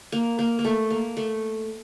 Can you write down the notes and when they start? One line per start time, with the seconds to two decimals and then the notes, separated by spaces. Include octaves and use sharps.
0.12 A#3
0.39 A#3
0.59 A#3
0.65 A3
0.90 A#3
1.17 A3